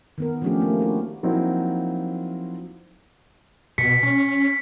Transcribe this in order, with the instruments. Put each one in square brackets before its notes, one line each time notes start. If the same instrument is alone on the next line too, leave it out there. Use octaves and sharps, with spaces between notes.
[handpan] D#3 B3 A#4
F3 F#3 A3 C#4 D4 G4
A3 A#3
D4 E4 F#4
[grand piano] F3 F#3 A#3 C4 D#4 E4
[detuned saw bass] B2 [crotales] B6 C#7
[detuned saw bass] C#4